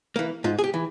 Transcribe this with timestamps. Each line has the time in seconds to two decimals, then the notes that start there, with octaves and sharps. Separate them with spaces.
0.16 E3 A#3
0.44 G#2 F4
0.59 G#4
0.64 G4
0.74 E3